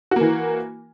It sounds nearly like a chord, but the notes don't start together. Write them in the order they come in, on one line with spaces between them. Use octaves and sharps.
F#4 A#3 E3